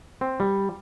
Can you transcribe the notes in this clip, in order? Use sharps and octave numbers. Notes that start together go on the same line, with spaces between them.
C4
G3